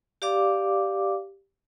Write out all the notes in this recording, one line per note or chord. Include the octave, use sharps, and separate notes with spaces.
G4 D5 F5 D6